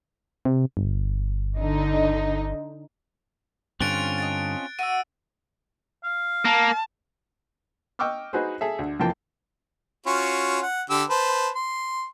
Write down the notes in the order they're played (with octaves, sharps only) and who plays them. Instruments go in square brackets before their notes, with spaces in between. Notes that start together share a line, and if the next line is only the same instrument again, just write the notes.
[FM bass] C3
G1
[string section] D3 D#4
[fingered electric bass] G2 D3 [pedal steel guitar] C4 C#4 F4 [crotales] F#6 A6 D7
[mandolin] D#5 F5 A5
[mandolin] F#4 D5 E5 [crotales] E6 D#7
[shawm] F5
[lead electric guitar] A#3 [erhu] A5
[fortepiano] D#5 G5 C#6 D6 E6 F6
D#4 F#4 G#4 B4 C5
G#4 A4 E5
D2
F2 E3 F3 A#3 G5 A5
[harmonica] C#4 F4 F#4
F#5
D3 G4 E6
B4 C5 A5
C6